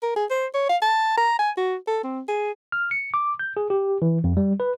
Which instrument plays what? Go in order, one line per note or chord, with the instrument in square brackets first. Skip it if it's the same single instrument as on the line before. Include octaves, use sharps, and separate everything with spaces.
[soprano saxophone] A#4
G#4
C5
C#5
F5
A5
A#5
G#5
F#4
A4
C4
G#4
[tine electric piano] F6
C#7
D6
G6
G#4
G4
E3
F2
G3
B4